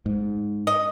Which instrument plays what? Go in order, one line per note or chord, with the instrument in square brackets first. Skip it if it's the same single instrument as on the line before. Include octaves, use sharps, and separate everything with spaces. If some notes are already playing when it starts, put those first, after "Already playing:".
[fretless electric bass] G#2
[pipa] D#5